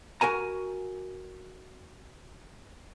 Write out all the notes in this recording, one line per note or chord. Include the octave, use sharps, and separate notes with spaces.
F#4 A#4 G#5 A#5